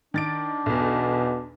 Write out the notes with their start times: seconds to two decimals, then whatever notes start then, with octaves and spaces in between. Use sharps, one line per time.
0.14 D#3 D4 A6 D7
0.66 B1 E2 B2